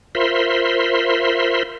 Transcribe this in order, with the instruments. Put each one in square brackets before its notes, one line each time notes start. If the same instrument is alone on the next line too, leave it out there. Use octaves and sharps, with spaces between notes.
[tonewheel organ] F4 A#4 C5 E5 B5 C6